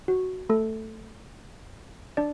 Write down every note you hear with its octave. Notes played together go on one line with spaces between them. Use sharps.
F#4
A3 A4
D4 D5